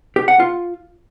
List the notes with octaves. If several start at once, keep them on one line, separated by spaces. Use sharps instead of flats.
G4
F#5
F4